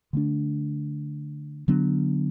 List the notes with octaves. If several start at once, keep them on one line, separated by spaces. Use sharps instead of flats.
D3 A3 D4
D3 F#3 B3 D4